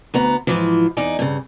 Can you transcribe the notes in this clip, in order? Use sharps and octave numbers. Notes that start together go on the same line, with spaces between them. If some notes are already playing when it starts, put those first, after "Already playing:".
D2 B3 A#5
G#2 E3 F3
E2 D#4 D5 G#5
G2 C#3